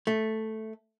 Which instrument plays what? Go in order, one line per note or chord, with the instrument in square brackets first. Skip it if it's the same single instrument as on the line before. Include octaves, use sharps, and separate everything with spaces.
[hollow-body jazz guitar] A3